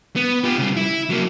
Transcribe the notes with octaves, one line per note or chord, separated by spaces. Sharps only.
B3
F4 G4
C#3 G3
E4
F#3 A#3